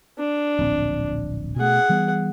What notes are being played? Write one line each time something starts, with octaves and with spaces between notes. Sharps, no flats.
D4
D1 A#1 C4
B2 A3 G#4 F#5
E3 G3 B3